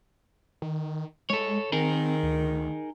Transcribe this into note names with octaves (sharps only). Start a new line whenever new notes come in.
D#3
G#3 A4 C#5
D#3 C4 D#4 G#4 A#4
D2